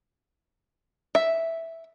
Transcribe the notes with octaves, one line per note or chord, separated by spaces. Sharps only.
E5